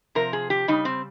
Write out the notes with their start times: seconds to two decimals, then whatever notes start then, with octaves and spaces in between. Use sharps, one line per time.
0.15 C3 F3 A#4
0.33 G#4
0.50 G4
0.68 C#3 G3 D#4
0.85 C4